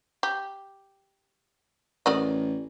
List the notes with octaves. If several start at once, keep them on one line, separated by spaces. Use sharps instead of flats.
G4
A1 A#4 D5 D#5